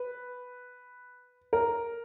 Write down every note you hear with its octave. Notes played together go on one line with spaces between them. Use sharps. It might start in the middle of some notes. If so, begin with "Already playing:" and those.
Already playing: B4
A#4